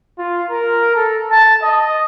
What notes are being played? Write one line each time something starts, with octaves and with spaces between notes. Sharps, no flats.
F4
A#4
A4
A5
D#5